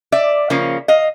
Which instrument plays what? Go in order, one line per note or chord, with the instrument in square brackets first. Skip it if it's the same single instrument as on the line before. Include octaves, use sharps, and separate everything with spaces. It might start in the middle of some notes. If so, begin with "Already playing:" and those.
[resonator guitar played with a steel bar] D5 E5
C#3 F3 A#3 C#4
D#5 F5